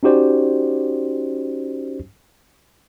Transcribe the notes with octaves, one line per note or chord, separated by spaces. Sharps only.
C#4 D#4 F#4 G4 C5 D5